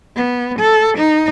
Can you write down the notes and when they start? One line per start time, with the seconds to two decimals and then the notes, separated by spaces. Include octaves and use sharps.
0.16 B3
0.59 A4
0.98 D#4